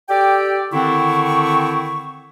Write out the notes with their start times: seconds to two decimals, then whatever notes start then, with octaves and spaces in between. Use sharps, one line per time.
0.09 G4 A4 D5 G5
0.73 D3 D#3 C4 E4 C#6